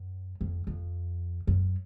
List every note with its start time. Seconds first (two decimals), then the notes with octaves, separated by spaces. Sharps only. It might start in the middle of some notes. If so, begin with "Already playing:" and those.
Already playing: F#2
0.41 F2
0.67 F2
1.47 F#2